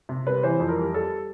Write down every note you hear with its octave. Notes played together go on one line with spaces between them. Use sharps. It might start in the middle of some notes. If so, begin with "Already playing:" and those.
C3
G3 B4
E3 C5
F2
A#4
G3
G3 A4